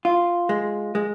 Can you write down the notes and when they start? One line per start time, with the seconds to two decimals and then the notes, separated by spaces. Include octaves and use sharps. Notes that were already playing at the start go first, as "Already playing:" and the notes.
0.05 F4
0.49 G#3
0.95 G#3